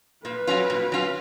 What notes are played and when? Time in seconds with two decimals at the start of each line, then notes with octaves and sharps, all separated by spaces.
0.25 A#2 B4
0.47 F#3 C#4 F4
0.70 A#2
0.92 F#3 C#4 F4